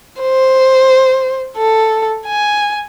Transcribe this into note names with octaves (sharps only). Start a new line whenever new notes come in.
C5
A4
G#5